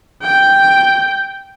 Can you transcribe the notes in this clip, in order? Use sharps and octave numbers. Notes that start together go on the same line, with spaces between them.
G5